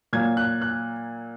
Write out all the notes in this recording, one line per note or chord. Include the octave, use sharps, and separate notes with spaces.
A#2 F#3 G#6
F#6
F#6